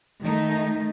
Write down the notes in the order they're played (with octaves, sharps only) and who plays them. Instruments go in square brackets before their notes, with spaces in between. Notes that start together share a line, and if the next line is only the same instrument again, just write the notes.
[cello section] D#3 A3 D#4